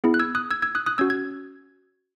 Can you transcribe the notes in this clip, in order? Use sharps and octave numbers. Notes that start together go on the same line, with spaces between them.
B3 E4 G#4
F#6
E6 G#6
D#6 F#6
E6 G#6
E6 G#6
D#6 F#6
D#6 F#6
C#4 F#4 E6 G#6
G#6